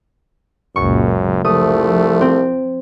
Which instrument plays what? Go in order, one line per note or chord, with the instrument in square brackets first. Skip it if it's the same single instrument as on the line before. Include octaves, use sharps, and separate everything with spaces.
[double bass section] F#1 C#2 A#2 [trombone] F#2 [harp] C#6
[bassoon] C2 [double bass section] F3 [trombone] A3 [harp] D#6
[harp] C4